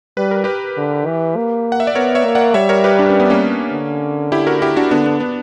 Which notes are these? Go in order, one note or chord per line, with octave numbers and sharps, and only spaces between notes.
G3 B4
A#4
G4 B4
D3
E3
A#3
F#5
E5
D5
B3 A#4 C#5
C#5 E5
A#3
D5 F#5
G3 C#5 E5
A#4 C#5
G4 B4
D4
C#4
B3
A#3 C#4
D3
E4 G4
F#4 A#4
E4 G4
D4 F#4
D3 B3 D4
B3
B3